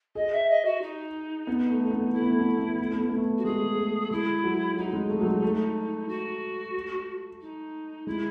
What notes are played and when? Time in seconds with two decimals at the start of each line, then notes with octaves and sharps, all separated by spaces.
0.15 G#4 D#5
0.32 E5
0.49 D#5
0.65 F#4
0.81 D#4
1.47 B3
1.70 A3
1.85 A3
1.91 B3
2.13 A3 E4
2.22 B3
2.30 A3
2.39 B3
2.48 A3
2.56 B3
2.65 A3
2.74 B3
2.83 A3
2.91 B3
3.00 A3
3.09 B3
3.17 A3
3.38 F#4
3.45 G#3 G#4
3.78 A3
4.11 G#3 E4
4.44 F#3
4.77 F#3 D#4
4.93 G#3
5.10 A3
5.21 F#3
5.26 G#3
5.43 A3
6.08 F#4
7.41 D#4
8.06 G#3 E4